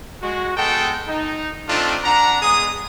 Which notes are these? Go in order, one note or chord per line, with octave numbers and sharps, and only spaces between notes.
G#3 F#4
G#3 B3 A4 G5
D#4
A3 C4 D4 D#4 F4
D4 F#5 A#5
G#3 B3 G#4 D#6